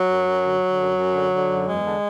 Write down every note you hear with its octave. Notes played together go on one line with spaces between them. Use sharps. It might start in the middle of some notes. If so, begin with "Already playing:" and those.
Already playing: F#3
F#2
F#2
D3
D3
F#2
F#2
D3
D3
F#2
E2 G#3
D3